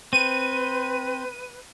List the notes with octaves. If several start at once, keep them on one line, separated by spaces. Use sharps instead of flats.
C4 B4 D#7